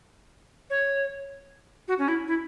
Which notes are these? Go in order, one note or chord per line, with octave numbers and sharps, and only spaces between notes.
C#5
F#4
C#4
E4
E4